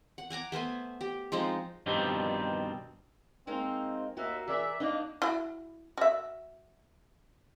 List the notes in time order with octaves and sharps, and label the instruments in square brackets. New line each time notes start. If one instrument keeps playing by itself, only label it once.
[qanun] F#5
F#5 G#5 A#5 D6
A3 B3 C5 G#5
G4
F3 G#3 C4 D#4
[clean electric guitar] G2 B2 D#3 F3 G3 C4
[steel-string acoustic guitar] G#3 A#3 D#4 [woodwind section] C4
[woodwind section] D#2 E5 [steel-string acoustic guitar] A#3 F#4 A#4
[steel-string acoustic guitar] E3 G#4 A#4 [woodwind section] D5 E5
[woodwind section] B2 A#3 [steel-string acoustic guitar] D4 D#4
[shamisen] E4 F#4
F#4 E5